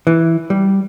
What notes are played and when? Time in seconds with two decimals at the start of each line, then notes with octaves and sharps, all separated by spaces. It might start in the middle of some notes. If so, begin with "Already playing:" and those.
0.07 E3
0.50 G3